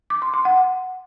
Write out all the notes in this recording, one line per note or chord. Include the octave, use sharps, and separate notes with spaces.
D6
C6
C6
F#5